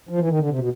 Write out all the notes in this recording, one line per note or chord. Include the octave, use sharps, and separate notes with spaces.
F3
E3
D#3
D3
C3
B2